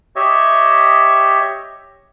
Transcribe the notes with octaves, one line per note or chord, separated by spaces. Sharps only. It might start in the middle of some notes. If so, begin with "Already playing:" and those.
G4 C#5 D#5 E5